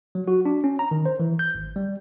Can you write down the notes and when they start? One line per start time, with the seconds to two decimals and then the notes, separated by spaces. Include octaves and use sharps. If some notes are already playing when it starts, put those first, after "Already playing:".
0.15 F#3
0.28 F#4
0.45 D4
0.64 C#4
0.79 A#5
0.91 D#3
1.06 C5
1.20 E3
1.39 G6
1.55 G#1
1.76 G3